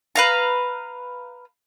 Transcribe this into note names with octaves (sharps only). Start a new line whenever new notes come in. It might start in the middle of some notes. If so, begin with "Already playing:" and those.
B4 F5 A#5